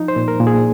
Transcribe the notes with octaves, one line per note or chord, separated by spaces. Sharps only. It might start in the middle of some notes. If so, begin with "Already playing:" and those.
Already playing: F3 D#4
C5
A#2
A#4
A#2
G#4